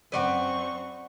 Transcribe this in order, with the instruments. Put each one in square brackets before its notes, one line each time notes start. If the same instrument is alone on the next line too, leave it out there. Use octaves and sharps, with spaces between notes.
[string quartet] F#2 C4 C#6 [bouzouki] B4 D5 F#5